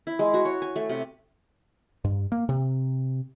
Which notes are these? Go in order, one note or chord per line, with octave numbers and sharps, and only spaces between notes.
E4
G#3
F#4
C#5
G#5
A3
C3
G2
A#3
C3